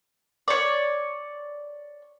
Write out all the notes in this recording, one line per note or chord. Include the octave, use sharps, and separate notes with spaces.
C#5 D5